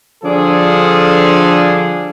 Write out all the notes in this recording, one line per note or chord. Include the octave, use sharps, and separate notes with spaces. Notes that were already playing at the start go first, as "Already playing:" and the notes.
D3 F3 G3 D4 G#4 A4